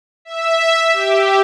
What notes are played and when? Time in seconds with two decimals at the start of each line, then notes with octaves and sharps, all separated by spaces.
0.25 E5
0.93 G4